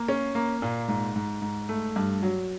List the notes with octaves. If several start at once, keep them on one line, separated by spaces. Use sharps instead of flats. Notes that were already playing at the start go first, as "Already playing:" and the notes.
Already playing: A#3
C#4
A#3
A#2
G#2
G#2
G#2
A3
G2
F#3